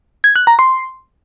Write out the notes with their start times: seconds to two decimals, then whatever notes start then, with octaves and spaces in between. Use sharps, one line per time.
0.24 G#6
0.36 F#6
0.47 A#5
0.59 C6